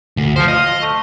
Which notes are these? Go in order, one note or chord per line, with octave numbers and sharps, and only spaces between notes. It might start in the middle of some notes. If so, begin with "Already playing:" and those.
D2
F3 F#3 C5
F4 D#5
A3